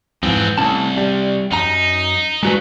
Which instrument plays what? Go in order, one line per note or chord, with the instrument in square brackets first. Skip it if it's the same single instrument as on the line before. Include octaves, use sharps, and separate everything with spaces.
[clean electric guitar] F2 G#2 E3 [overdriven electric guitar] B3 C4
[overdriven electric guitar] C2 [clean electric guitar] A2 C#4 A5
[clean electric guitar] G3
[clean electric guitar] F#2 A#5 [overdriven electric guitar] D#4
[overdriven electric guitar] G2 [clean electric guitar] G#3 F#4 B4